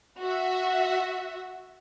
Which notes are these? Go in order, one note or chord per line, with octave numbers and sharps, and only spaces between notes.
F#4 E5